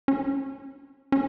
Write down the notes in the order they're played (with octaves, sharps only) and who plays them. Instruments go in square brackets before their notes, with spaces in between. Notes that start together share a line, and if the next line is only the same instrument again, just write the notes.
[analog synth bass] C#4
C#4